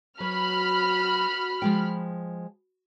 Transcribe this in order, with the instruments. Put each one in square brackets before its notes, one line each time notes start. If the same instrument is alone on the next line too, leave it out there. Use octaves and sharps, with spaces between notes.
[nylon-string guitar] F#3 B4 [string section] F#4 B5 F6
[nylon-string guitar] F3 G#3 G5